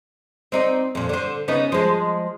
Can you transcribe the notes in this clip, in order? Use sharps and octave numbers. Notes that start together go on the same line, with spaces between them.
C4 D#4 D5
F2 A#2
D3 C5
C#3 B3 D#4
F3 G#3